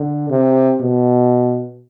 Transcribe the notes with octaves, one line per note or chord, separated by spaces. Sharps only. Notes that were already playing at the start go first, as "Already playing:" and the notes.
Already playing: D3
C3
B2